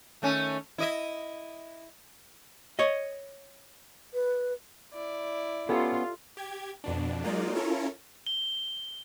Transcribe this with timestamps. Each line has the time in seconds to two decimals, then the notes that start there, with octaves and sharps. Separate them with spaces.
0.22 D#3 A3 C#4
0.78 E4 D#5 E5
2.79 C#5 D#5
4.14 B4
4.93 E4 D5
5.69 B3 C#4 F4 G4 A4
6.37 G4 G#6
6.84 F2 B2 D4
7.24 F#3 G#3 A#3 D#4 F4 D5
7.55 C#4 E4 F4 A4 A#4 C#5
8.27 G7